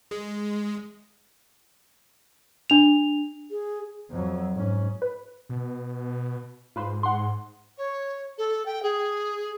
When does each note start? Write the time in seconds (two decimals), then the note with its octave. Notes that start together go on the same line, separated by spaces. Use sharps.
0.11 G#3
2.70 D4 F7
3.50 G#4
4.11 F2 F#3
4.53 G#2 C#4
5.02 B4
5.49 B2
6.76 G#2 F4 B4 C5
7.03 F#5 C6
7.77 C#5
8.38 A4
8.65 G5
8.82 G#4